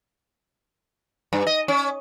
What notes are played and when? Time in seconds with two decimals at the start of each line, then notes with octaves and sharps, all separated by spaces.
1.33 G2
1.47 D#5
1.68 C#4